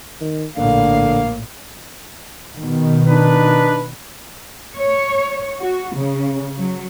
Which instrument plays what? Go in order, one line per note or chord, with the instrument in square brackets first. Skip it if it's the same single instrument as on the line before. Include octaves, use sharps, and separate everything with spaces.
[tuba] D#3
[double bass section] A#1 A2 [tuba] D3 [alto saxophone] A#3 [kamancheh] F5
[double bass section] B2 D#3
[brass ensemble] D4 D#4 B4
[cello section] C#5
F#4
C#3
F#3